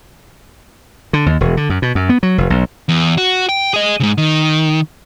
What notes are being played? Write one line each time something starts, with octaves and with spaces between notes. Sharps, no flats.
D3
D#2
E1
D3
F#2
B2
F#2
B3
F#3
F1
B1
E2
F#4
G5
G#4 D#5
G#2 C#3
D#3